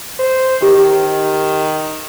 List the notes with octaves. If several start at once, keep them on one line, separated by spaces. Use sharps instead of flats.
C5
D#3 G4